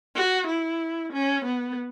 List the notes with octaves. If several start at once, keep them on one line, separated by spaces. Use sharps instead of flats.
F#4
E4
C#4
B3